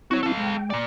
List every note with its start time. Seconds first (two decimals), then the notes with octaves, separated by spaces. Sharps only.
0.11 C4 E4 F#4 C#5
0.23 A4 F5
0.37 G#3 G5
0.70 A#2 D5